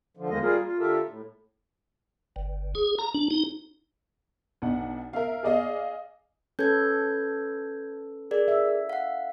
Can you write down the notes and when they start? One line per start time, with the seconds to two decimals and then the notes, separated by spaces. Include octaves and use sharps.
0.17 D3 F3
0.29 E2 D#3 G#3 A#3 D#5
0.42 G3 A#3 F4 G#4 A#4
0.64 F4
0.79 D3 F4 G4 A4 A#4 E5
1.07 A2
2.36 G1
2.75 G#4
2.99 A#5
3.14 D4
3.31 D#4
4.62 B1 D4 F#5
5.13 A#4 E5 F5
5.43 G#4 D5 D#5 F5
6.59 C#4 A4 B4 G6 G#6
8.31 G#4 A#4 D5
8.48 E5
8.89 F5 F#5